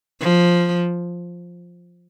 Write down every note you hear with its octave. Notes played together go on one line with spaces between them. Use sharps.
F3